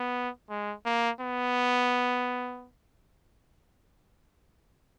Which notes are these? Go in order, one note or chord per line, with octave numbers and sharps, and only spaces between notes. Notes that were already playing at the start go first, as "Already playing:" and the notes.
Already playing: B3
G#3
A#3
B3